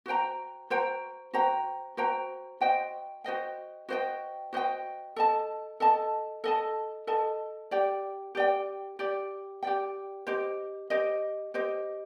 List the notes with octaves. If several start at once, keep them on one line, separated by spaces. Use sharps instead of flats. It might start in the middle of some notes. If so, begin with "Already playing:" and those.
F#4 C5 G5 A#5
F#4 C5 G5 A#5
F#4 C5 G5 A#5
F#4 C5 G5 A#5
F#4 C5 D#5 G5
F#4 C5 D#5 G5
F#4 C5 D#5 G5
F#4 C5 D#5 G5
A4 D#5 A5
A4 D#5 A5
A4 D#5 A5
A4 D#5 A5
G4 D5 G5
G4 D5 G5
G4 D5 G5
G4 D5 G5
G4 C5 D#5
G4 C5 D#5
G4 C5 D#5